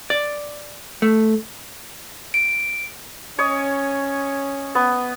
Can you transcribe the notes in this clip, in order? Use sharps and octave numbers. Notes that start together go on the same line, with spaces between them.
D5
A3
D7
C#4 C#5 D#5
B3